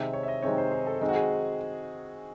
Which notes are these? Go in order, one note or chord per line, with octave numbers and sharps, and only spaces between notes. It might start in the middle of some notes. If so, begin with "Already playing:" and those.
Already playing: C3 D#3 G#3 C4 E5
C#5
E5
D#5
C3 D#3 G#3 C4 C#5
C5
G#4
A4
D#3 G#3 C4
F#4
G#4